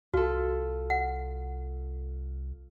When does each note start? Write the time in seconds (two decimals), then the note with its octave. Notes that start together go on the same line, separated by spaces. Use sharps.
0.14 C2 F4 F#4 A4
0.90 F#5